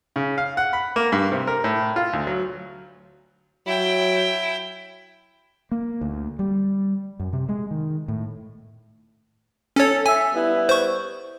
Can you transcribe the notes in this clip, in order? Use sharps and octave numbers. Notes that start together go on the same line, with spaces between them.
C#3
F5
F#5
B5
A#3
G2
C3
A#4
A2
F4
D2
F#3
F#3 E4 G5
A#3
D2
G3
F#2
C3
G#3
D#3
A2
C#4 A4 C#5
E5 G#5
G3 B3 E4
C5 C#6